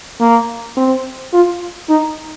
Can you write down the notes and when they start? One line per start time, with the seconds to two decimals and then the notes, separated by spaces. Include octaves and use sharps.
0.21 A#3
0.77 C4
1.33 F4
1.89 D#4